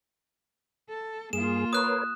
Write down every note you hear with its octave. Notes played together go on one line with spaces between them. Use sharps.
A4
G2 A#3 F4 G#4 E7
A#4 B4 C#5 D#6 F#6